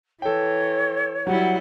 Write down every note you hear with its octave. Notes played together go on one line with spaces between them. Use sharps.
E3 A4 C#5 G5
F#3 G3 E4 F#5